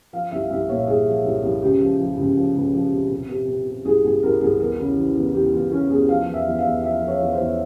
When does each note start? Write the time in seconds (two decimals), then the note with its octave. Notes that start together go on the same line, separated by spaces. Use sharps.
0.13 F3 F5
0.31 C2 E5
0.50 C2 E5
0.69 A#2 C#5
0.87 C2 G#4
1.06 F3
1.24 C2
1.43 C2
1.62 C#2 G4
1.81 F3
1.99 F3
2.18 C#2
2.37 F3
2.55 C#2
2.74 F3
2.92 C3
3.11 C3
3.29 C3
3.48 C3
3.67 C3
3.85 C2 G#4
4.04 C2 G#4
4.23 C2 A#4
4.41 C2 G#4
4.59 E2 A#4
4.78 C#3
4.97 E3
5.16 E2
5.34 E2 G4
5.53 E2 F4
5.71 E3 C#4
5.90 E2 G#4
6.08 F3 F5
6.27 E2
6.34 E5
6.46 E2
6.59 F5
6.65 E2
6.83 F3 E5
7.02 F3
7.08 C#5
7.21 E2
7.33 C5
7.39 E2